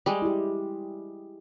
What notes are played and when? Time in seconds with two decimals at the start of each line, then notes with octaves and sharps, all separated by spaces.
0.06 G3 G#3
0.22 E4 G4